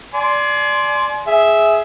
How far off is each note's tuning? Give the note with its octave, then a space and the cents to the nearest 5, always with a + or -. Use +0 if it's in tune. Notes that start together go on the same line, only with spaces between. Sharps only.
D5 -5 G#5 +35 C6 +5
G#4 +10 E5 -5